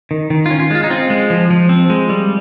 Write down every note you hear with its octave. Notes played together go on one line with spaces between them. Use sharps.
D#3
D#3
C#4 F4
F4
G#3 F4
D#4
C4 F4
G#3
F3
F3
C4
G#3
G3